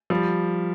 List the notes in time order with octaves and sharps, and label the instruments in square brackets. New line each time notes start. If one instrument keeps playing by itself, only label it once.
[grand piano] F3 G3